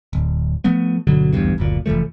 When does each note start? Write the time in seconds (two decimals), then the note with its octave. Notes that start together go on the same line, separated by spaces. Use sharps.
0.13 D1
0.64 F3 A3 B3
1.07 G1 B2 D3 F#3
1.33 D1 A1 E2 G2
1.58 F#1 D2 A#2
1.86 F1 E3 F3 A3